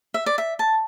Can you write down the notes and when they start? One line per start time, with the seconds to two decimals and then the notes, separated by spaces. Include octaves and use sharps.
0.14 E5
0.26 D5
0.38 E5
0.59 A5